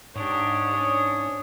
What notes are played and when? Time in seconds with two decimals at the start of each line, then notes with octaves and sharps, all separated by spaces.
0.16 G#2 D4 G4 C#5 D#6
0.70 C#4 D4